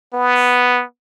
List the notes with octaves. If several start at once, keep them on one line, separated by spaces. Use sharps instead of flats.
B3